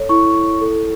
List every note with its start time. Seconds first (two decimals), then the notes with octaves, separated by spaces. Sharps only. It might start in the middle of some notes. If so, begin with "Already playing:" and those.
Already playing: A4 C#5
0.09 E4 C#6
0.35 E4
0.61 A4